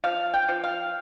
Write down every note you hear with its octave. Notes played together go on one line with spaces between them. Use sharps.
F3 F5
G5
F3
F5